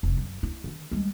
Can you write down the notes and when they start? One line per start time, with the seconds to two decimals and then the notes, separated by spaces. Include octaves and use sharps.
0.03 F1
0.17 F#2
0.43 E4
0.64 D3 D#3
0.91 G3 G#3